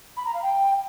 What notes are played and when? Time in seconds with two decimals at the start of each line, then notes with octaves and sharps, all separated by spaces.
0.17 B5
0.25 A#5
0.34 F5
0.42 G5